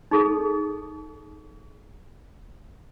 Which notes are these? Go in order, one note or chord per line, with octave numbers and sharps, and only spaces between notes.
D#4 G#4 A4